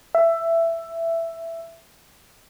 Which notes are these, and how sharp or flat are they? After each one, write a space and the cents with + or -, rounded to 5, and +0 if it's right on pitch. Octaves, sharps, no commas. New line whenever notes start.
E5 +10